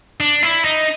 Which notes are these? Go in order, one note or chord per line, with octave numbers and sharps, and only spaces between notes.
D4
E4
D#4